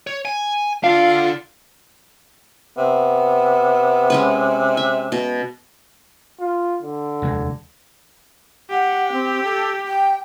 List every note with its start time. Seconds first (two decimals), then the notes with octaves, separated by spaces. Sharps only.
0.07 C#5
0.25 G#5
0.84 D3 D4 F4 F5
2.78 C3 B3
4.10 G#3 C#4 B4
4.77 E5
5.12 B2
6.40 F4
6.83 D3
7.22 F1 D#2 G#3
8.70 G4 F#5
9.12 C4
9.43 A4
9.86 G5